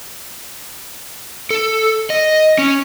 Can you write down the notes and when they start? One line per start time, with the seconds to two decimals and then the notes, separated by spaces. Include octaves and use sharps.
1.51 A4
2.10 D#5
2.58 C#4